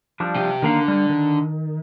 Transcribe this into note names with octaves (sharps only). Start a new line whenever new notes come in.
F3 G3 D4
C3 G4
D3 D#3 A#3 F5
G3
D#3